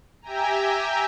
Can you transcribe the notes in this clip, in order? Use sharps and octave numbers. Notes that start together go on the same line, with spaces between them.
G4 E5 G5 G#5 A#5